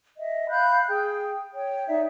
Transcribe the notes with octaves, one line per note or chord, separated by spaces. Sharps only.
D#5 E5
F5 B5 F#6 G6
G#4 G5
C#5 G5
D#4 D5 E5